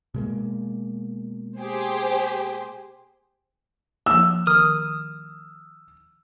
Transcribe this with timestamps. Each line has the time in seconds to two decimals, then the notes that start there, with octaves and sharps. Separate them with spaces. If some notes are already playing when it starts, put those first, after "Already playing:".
0.14 B2 G#3 A#3
1.59 G4 G#4 C5
4.06 F3 A#3 E6
4.47 D#3 D#6 F6